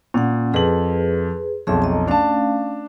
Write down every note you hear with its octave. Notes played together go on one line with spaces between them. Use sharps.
A#2 C#4 F#5
F2 G#4 B4 F#7
B1 F2 G#4 E5
D#5 A#5
A3 C#4 D4 F5 A5